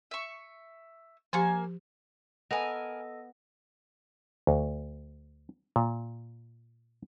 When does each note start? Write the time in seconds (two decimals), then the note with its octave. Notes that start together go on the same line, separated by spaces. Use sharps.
0.11 E5 C#6
1.33 F3 A#3 G4 G#5
2.51 B3 A4 A#4 D#5 G#5
4.47 D2
5.76 A#2